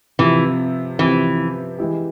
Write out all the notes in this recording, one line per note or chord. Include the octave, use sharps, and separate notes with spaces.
C3 E3 F3 C4 G4
C3 E3 F3 C4 G4
E3 G#3 E4 G4